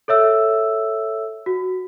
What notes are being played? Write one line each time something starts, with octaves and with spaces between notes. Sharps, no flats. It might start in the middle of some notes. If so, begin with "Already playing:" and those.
A4 C#5 E5 E6
F#4